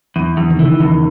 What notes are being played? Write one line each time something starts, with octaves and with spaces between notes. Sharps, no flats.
E2
E2
D#3
C#3 E3
E2 D#3